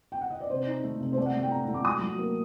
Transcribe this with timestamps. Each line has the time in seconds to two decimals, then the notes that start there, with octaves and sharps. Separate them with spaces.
0.12 G5
0.21 F#5
0.30 D#5
0.41 D5
0.50 C3 C5
0.67 D#4
0.83 A3
1.00 C3
1.13 C5
1.17 A3 D5
1.26 F#5
1.35 A3
1.43 G5
1.51 A2 A#5
1.68 A3
1.74 D6
1.85 F#3 D#6
2.02 F#3
2.19 A#3